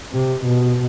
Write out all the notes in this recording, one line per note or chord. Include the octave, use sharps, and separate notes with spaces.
C3
B2